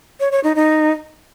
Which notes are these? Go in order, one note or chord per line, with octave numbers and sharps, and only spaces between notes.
C#5
C#5
D#4
D#4